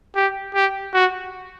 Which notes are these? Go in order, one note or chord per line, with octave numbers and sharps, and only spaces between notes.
G4
G4
F#4